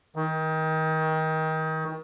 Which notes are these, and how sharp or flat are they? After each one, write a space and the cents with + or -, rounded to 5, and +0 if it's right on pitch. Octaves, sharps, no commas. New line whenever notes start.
D#3 +25